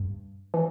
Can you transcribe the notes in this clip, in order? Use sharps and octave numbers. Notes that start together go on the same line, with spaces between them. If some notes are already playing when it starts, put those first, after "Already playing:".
Already playing: G2
E3